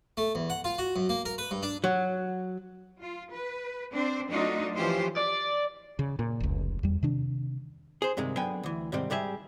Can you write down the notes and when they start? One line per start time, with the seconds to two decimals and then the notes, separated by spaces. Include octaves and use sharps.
0.17 A3
0.35 E2
0.50 F#5
0.64 F4
0.79 F#4
0.96 F#2
1.09 A#3
1.26 A#4
1.38 B4
1.51 G2
1.63 D4
1.84 F#3
3.00 F4
3.34 B4
3.92 C4 D4 C5
4.29 F#3 A3 D4 D#4 F4 F#4
4.74 E3 F3 C#4 F4 G4 C5
5.17 D5
5.99 C#3
6.19 A#2
6.40 F1 C#2
6.83 E2 G3
7.03 C3 D#3 D4
8.02 G#4 C5
8.17 G2 C3 D#3 G#3
8.37 D3 F#3 B3 G5 G#5
8.63 D2 E3
8.92 G#2 C3 D#3 G3 C4
9.10 G#2 G3 G4 G#4 E5